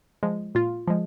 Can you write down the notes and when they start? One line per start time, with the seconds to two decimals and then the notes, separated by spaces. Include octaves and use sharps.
0.23 F3 G#3
0.55 A#2 F4
0.87 F3 G#3